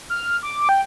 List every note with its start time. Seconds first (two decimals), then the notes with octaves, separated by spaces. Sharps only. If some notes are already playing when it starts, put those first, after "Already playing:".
0.10 F6
0.43 D6
0.69 G5